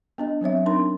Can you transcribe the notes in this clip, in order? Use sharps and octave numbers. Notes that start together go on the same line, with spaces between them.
B3 D4 D#5
F#3 C4 C#5 E5
C4 D4 D#4 A#4 C6